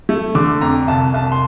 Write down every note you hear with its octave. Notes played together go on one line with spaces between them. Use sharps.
A3
D3 D6
F2 A#5
C2 A5
C2 A5
C6